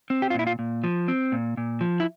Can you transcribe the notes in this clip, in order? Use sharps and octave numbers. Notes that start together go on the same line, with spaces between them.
C4
G4
F4
A#2 E4
F4
A#2
F3
C4
A#2
A#2
F3
E4